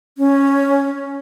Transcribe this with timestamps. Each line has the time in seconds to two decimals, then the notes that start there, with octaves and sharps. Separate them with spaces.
0.18 C#4